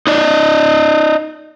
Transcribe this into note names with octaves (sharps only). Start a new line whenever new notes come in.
D#4 D5 D#5